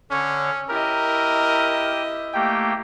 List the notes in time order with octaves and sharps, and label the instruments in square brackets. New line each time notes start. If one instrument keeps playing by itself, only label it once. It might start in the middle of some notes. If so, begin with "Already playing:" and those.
[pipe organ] D3 C#5 [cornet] C#4
[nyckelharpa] E4 D#5 [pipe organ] G4 [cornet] A#4
[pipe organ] A3 A#3 G4 [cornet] G5